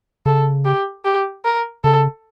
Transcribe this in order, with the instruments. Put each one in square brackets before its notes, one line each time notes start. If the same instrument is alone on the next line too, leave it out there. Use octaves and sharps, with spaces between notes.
[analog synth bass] C#3 [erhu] A4
[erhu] G4
G4
A#4
[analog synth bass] C#3 [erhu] A4